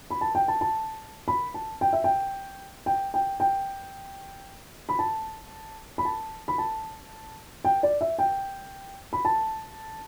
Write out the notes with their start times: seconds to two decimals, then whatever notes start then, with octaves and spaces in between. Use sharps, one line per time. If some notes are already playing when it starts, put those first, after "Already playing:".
0.11 B5
0.21 A5
0.35 G5
0.48 A5
0.61 A5
1.28 B5
1.54 A5
1.81 G5
1.93 E5
2.04 G5
2.86 G5
3.14 G5
3.40 G5
4.89 B5
4.99 A5
5.98 B5
6.05 A5
6.48 B5
6.58 A5
7.65 G5
7.83 D5
8.01 E5
8.19 G5
9.13 B5
9.25 A5